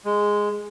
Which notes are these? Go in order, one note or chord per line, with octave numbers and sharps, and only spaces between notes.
G#3